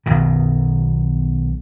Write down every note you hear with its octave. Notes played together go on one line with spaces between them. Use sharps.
B1 B2 D#3